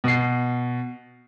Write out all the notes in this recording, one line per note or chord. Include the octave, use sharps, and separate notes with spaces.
B2 C7